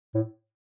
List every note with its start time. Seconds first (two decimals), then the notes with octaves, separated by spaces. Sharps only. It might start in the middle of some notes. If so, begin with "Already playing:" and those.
0.15 A2